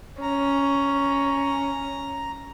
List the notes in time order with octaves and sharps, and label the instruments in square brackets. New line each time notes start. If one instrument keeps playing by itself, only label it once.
[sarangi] C#4 [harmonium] A#5